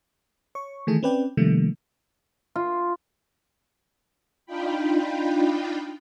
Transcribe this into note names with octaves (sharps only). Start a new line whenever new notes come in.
C#5 C#6
D#3 E3 A3 G#4 A4
C4 C#4 B4 D5 G5
C3 D#3 F3 G3 A3 A#3
F4
D4 D#4 F4 G5 B5